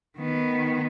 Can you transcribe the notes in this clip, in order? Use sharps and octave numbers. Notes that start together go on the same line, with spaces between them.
D#3 B3